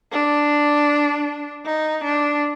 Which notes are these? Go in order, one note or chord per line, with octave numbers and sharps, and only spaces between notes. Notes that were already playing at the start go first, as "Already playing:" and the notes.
D4
D#4
D4